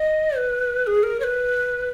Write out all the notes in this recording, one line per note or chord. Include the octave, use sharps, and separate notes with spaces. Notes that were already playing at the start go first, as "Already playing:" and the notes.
Already playing: D#5
B4
G#4
A#4
C#5
B4